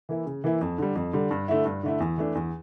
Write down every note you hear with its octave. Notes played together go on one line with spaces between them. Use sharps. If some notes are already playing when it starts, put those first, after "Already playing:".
E3 A#3 E4
C#3
E3 A#3 E4
F2
D3 G3
F2
D3 G3
G2
D3 A3 E4
G2
D3 A3 E4
E2
E3 A3 D4
E2